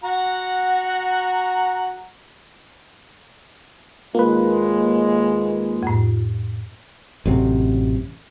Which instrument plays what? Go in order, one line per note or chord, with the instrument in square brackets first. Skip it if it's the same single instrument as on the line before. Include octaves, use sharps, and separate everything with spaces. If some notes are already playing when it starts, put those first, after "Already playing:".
[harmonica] F#4 F#5 A#5
[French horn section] D#2 G#3 [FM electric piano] A#3 B4 [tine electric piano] F4
[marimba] F2 A2
[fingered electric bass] A1 F#2 C3